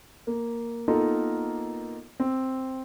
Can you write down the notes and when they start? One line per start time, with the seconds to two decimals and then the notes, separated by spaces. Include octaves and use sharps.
0.27 A#3
0.88 A#3 B3 D#4 F4 A4 A#4
2.20 C4